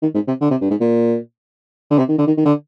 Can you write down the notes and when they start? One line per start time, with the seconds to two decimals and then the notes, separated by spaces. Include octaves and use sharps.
0.02 D#3
0.15 G#2
0.28 C3
0.41 D3
0.51 C3
0.61 G2
0.71 G#2
0.81 A#2
1.90 D3
1.99 C3
2.09 D#3
2.19 D3
2.27 D#3
2.37 D#3
2.46 D3